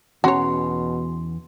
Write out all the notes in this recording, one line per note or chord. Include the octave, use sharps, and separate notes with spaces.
E2 B2 C#4 F#4 C#5 A#5 C6